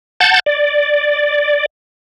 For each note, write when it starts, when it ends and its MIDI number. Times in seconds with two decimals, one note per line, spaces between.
0.20 0.39 78
0.20 0.39 81
0.20 0.39 91
0.20 0.39 93
0.46 1.66 74